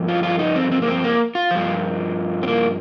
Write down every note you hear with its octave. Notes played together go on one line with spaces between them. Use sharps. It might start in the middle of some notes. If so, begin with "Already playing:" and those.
Already playing: G2 F3
F4
F4
D#4
C4
C4
A#3
C4
A#3
F4
G2 F3
C4
A#3